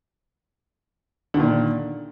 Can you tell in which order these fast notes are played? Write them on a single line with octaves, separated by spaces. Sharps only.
D3 D#3 A#2